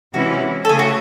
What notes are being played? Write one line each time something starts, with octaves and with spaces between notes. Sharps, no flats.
C3 E3 G#3 C#4 E4 F#4
A4
C#3 A3 G#4
F#4